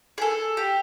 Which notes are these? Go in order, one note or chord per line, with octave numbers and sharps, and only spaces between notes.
G#4
A4
G4